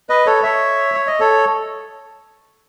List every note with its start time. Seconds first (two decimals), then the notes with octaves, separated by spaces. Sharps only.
0.09 B4 D#5
0.26 A4 C#5
0.43 C#5 E5
0.94 C#5
1.07 D#5
1.20 A4 C#5